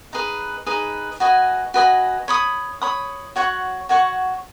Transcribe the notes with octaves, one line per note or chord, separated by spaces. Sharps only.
D#4 G#4 B4
D#4 G#4 B4
F#4 B4 D#5 G#5
F#4 B4 D#5 G#5
C#5 B5 D#6
C#5 B5 D#6
F#4 C#5 F#5 C#6
F#4 C#5 F#5 C#6